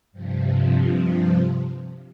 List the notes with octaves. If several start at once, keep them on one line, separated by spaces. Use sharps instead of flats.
G2 C3 F3